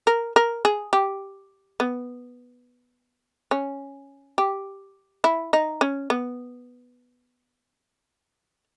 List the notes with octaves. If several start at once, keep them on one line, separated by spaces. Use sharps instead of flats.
A#4
A#4
G#4
G4
B3
C#4
G4
E4
D#4
C#4
B3